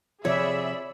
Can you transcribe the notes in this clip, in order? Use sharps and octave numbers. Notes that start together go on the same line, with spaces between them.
C3 F3 G#4 C#5 D5 E5 B5